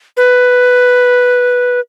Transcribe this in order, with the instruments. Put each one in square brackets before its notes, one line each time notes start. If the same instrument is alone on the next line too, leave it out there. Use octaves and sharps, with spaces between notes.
[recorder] B4